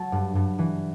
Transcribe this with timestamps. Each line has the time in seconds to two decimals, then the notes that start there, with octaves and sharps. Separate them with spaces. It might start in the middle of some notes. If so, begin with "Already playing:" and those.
Already playing: F#3 A5
0.12 G2
0.35 G2
0.59 E3